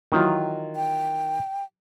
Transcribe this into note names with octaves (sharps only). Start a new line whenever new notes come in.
D#3 E3 F#3 F4
G5